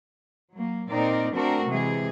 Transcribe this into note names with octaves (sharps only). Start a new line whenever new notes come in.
F#3 A#3
A#2 C4 D#4 A#4 D5
A3 C4 D4 F#4 A#4
C3 E3 G#3 G#4